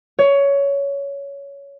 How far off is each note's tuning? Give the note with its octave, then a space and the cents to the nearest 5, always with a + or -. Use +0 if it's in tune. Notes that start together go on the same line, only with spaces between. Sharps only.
C#5 +15